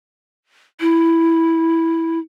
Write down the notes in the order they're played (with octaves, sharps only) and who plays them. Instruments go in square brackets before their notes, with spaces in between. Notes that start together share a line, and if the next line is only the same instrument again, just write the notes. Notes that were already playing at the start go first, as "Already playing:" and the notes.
[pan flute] E4